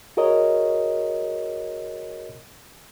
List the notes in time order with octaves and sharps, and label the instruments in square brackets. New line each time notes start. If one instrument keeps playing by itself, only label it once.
[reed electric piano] F#4 G#4 A#4 C#5 D#5